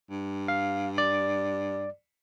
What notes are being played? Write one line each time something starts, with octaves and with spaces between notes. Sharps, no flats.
G2
F5
D5